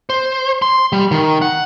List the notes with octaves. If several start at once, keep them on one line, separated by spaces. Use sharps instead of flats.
C5
C6
G3
D#3
F#5